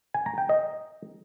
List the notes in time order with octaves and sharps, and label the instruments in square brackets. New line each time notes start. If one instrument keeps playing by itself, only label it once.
[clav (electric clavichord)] G#5
A#5
G5
D#5